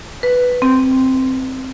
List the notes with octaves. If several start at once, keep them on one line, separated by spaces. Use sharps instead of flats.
B4
C4